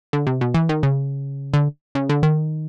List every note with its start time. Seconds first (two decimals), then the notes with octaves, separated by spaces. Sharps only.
0.13 D3
0.27 C3
0.41 B2
0.54 E3
0.69 D#3
0.83 C#3
1.54 D3
1.95 C#3
2.09 D3
2.23 D#3